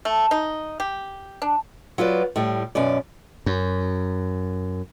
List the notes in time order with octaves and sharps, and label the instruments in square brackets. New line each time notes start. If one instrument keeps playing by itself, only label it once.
[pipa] A3
D#4
G4
D4
[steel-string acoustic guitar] F#3 F4 B4 D5
A2 G3
F#2 B2 C#4 D5
[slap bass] F#2